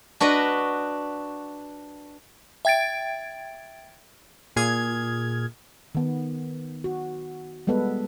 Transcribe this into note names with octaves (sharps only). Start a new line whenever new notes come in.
D4 F#4 B4 D#5
E5 G5 G#6 A6 D7
A#2 G#4 F6 G#6
D#3 B3
F#4
G3 G#3 B3 A4 B4